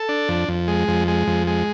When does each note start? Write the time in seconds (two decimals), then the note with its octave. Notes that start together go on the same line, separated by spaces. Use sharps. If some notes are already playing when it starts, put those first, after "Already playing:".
Already playing: A4
0.09 D4
0.29 F2
0.49 F2
0.68 G#3
0.88 F2
1.08 G#3
1.27 F2
1.47 G#3